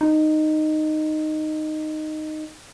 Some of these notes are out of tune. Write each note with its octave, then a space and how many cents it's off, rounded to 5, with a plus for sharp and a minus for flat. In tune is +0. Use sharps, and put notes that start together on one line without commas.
D#4 -10